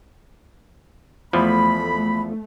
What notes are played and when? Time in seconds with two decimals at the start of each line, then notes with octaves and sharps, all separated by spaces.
1.33 E2 F3 A3 B5